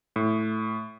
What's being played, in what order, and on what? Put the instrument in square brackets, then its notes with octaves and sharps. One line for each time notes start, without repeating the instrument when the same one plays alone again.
[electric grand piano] A2